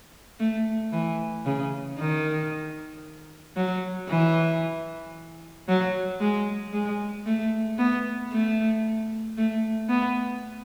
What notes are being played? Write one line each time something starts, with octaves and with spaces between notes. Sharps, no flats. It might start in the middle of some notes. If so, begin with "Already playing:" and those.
A3
E3
C#3
D#3
F#3
E3
F#3
G#3
G#3
A3
B3
A3
A3
B3